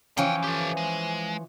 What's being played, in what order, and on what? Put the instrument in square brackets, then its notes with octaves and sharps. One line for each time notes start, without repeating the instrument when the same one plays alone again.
[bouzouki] E3 F3 C#4 [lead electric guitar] F5 G5
[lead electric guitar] G4 A4
G#3